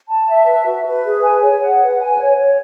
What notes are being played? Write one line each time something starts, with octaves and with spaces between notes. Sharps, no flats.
A5
E5
B4
F#4
B4
G#4
G#5
C#5
F#5
B4
G#5
C#5
C#5